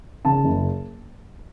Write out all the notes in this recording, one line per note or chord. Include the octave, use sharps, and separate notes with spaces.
C#3 A5
F#1